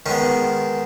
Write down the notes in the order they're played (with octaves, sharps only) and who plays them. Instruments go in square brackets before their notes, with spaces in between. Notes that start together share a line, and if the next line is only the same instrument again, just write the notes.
[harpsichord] D#3 G#3 B3 C#4